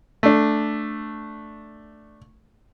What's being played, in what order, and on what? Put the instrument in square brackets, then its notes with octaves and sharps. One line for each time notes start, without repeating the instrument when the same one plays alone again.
[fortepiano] A3 D4